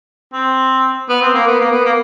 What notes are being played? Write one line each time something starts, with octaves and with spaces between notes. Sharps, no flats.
C4
B3
C4
A#3
B3
A#3
B3
A#3